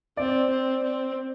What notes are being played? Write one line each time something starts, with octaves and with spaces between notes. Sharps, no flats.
C4 D5
C4
C4